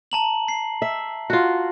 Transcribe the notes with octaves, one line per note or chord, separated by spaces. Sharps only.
A5 A#5 F#7
C7
E5
F4 F#4